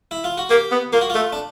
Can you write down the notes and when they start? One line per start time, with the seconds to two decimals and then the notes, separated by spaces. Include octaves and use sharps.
0.11 E4
0.24 F4
0.38 F#4
0.50 A#3 G4
0.71 B3
0.93 A#3 F4
1.01 F#4
1.10 A3 F4
1.33 D4